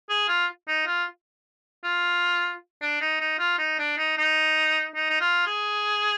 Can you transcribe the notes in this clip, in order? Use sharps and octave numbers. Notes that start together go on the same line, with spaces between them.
G#4
F4
D#4
F4
F4
D4
D#4
D#4
F4
D#4
D4
D#4
D#4
D#4
D#4
F4
G#4